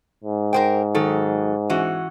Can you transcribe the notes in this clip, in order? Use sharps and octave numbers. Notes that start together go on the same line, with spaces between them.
G#2
A#4 C5 G5
D#3 F#3 A4
E3 C#4 F#4